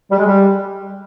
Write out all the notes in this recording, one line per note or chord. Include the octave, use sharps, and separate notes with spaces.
G3
G#3
G3